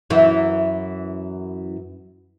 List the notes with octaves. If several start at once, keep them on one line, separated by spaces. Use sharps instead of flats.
F#2 E3